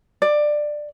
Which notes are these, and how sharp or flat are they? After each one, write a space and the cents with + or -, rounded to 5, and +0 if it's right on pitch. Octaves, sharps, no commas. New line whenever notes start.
D5 +15